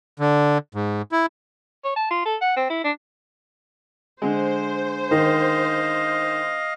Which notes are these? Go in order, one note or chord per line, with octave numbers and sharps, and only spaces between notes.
D3
G#2
E4
C#5
A5
F4
A4
F#5
C4
E4
D4
D3 G#3 C5
D#3 D#5 F5